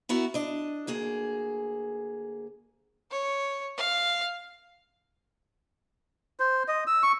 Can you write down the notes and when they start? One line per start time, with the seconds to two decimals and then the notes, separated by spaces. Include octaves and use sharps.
0.09 B3 E4 F#4 A#4
0.34 D4 D#5
0.87 D2 A#3 G#4
3.11 C#5
3.77 F5
6.40 C5
6.68 D#5
6.87 E6
7.03 C#6